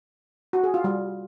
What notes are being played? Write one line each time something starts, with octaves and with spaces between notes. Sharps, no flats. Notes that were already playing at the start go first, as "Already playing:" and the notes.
F#4
G#4
F4
G3